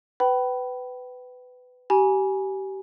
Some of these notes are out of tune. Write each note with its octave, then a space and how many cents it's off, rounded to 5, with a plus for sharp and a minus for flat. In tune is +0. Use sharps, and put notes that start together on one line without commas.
B4 +15 G5 -30 B5 +0
G4 -25 G#5 +0 B5 -40